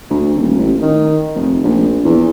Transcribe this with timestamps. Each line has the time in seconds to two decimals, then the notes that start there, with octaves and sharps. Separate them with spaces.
0.10 D2
0.35 D#1
0.58 A1
0.82 D#3
1.35 F1
1.64 A#1
2.04 E2